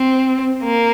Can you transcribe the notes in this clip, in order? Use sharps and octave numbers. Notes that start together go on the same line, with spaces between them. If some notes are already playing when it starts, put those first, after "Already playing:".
Already playing: C4
A#3